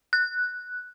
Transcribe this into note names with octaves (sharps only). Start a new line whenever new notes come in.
F#6